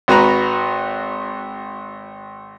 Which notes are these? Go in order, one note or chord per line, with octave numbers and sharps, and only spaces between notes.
G#1 F#4 B4 A#5